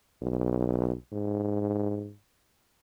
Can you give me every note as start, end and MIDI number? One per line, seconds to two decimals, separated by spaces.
0.22 0.94 35
1.12 2.14 44